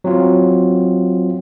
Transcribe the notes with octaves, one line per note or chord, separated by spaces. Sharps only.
F#3 C4 F4